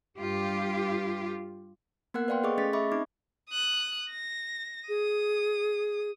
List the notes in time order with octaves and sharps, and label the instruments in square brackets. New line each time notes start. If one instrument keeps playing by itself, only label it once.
[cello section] G2 F4 G4
[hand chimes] A#3 B3 A#4 F#5 F#6
B4 D5 F5 G5 C6
G#4 A4 D#5 C#6 D6
A3 C#4 G#4 D#5 A6 B6
D#5 E5 B5 C#6 D6
C4 D#4 D6
[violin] D#6 F#6
A#6
[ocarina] G#4 [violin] D#6